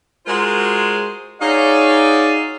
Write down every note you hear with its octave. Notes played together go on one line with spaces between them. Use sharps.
G#3 F4 F#4 G#4 A#4 C5
D#4 F#4 G#4 C#5 D5 F5